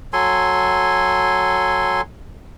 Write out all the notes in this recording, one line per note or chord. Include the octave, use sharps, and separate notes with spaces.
F#3 A4 G#5 C6